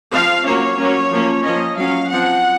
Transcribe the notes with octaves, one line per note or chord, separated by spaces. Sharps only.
F3 C4 F5
F#3 A#3 C#4 C#5
F#3 A#3 C#4
F3 A#3 C#4
F3 A#3 C#4 D#5
F#3 C#4 F5
F3 C4 F#5